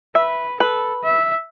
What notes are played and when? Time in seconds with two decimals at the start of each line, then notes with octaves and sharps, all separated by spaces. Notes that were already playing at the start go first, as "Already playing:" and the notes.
0.15 B4 E5
0.60 A4 B4
1.03 E5